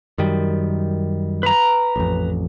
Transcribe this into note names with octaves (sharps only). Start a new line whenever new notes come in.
F#2 D#3 G3
B4 A#5
A1 F2